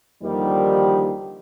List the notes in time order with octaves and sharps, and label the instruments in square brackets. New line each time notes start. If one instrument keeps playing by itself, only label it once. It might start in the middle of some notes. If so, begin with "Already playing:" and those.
[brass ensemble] D#2 D3 D#3 F3 G3